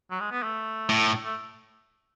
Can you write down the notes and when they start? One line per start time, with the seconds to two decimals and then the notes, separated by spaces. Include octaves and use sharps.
0.11 F#3
0.20 G#3
0.31 B3
0.43 A3
0.89 A2
1.24 A3